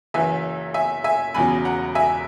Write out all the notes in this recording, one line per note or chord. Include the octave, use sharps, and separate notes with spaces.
F#1 F#2 E3 E5 G#5
E5 G#5
E5 G#5
E1 E2 C#3 F#3 G#5 B5
F#5 A#5
E5 G#5